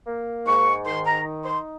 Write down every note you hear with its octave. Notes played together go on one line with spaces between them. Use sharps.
A#3
G#2 C#6
D#3 C6
A#5
D#4
C6